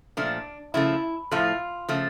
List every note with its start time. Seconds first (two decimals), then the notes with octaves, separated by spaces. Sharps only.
0.17 A#2 F3 A3 D4
0.74 C#3 F3 A3 E4
1.31 A2 F3 A3 F4
1.89 C#3 F3 A3